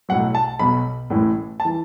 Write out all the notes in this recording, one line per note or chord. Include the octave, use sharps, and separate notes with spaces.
B1 A2 F#3 F#5
A5
B1 B2 F#3 B5
A1 A2 E3
A5
E3